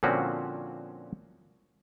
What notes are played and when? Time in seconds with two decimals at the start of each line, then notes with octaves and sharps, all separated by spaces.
0.03 A#2 D3 F3 C4 C#4 F#4